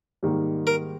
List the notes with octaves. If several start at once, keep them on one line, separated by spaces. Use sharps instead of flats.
G#2 D#3 G3 A#3
A#4